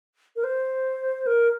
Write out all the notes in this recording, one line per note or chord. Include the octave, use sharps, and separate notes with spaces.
A#4
C5
A#4